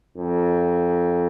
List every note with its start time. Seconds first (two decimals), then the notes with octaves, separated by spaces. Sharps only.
0.17 F2